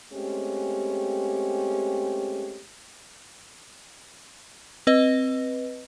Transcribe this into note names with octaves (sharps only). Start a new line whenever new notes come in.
G#3 A3 C4 C#4 G4
C4 B4 D#5